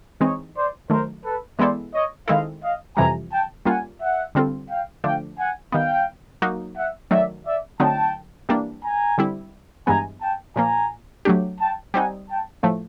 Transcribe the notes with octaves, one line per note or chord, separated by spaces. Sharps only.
E3 G#3 C4 D#4 C#5 D#5
C5 D5
D#3 F#3 A3 A#4 C5
A4 B4
E3 G#3 B3 E4 A4 C5 D5
C#5 D#5
D#3 G#3 C4 E4 A4 D#5 F5
D#5 F5
F2 C3 E3 G3 G#5 A#5
G5 A5
G3 A#3 C#4 F4 F#5 G#5
E5 F#5
D3 G3 C4 F4 A4
F5 G5
D3 F3 A3 D4 F5 G5
F#5 G#5
D#3 G3 B3 F5 G5
F#3 A#3 D#4 F#4
E5 F#5
D#3 F#3 A3 D5 E5
D5 E5
D3 F#3 A3 C4 D#4 G5 A5
E3 G3 A#3 D4
G#5 A#5
D3 G3 C4 E4
G2 E3 G#3 B3 G#5 A#5
G5 A5
A#2 F3 A#3 G#5 A#5
F#3 A3 D4 G4
G5 A5
G3 C4 D#4 F#5 G#5
G5 A5
A2 F3 A3